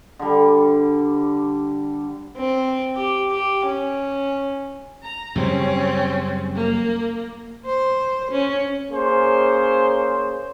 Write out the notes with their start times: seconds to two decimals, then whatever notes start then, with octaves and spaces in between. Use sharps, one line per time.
0.19 D3 G3
2.36 C4
2.95 G4
3.31 G4
3.65 C#4
5.03 A#5
5.36 F#2 C#3 G3 C4 C#4
6.55 A#3
7.66 C5
8.32 C#4
8.91 A#3 C#4 G#4 C5